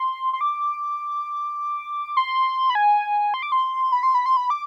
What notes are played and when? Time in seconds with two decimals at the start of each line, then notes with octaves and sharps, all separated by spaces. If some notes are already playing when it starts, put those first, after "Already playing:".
Already playing: C6
0.33 C6
0.41 D6
2.17 C6
2.70 B5
2.75 G#5
3.34 C6
3.43 D6
3.52 C6
3.92 B5
4.03 C6
4.14 B5
4.26 C6
4.37 B5
4.50 D6